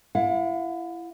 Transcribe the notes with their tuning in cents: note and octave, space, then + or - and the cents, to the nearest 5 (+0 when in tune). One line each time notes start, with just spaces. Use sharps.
E4 +30 F#5 -45